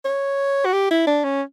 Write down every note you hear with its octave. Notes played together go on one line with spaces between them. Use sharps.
C#5
F#4
G4
E4
D4
C#4